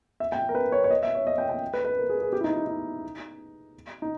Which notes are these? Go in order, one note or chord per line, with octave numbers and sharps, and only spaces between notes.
E5
G5
A#4
B4
C#5
C#5
D#5
E5
C#5
D#5
G5
G5
B4
B4
A#4
G#4
G#4
G4
E4
D#4
E4
D#4
D#4